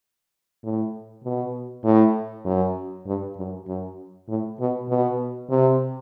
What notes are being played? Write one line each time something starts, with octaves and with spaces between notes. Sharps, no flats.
A2
B2
A2
F#2
G2
F#2
F#2
A2
B2
B2
C3